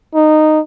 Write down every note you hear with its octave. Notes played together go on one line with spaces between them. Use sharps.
D#4